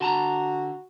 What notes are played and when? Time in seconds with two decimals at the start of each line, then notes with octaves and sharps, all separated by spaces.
0.01 D3 F#4 A5 A#5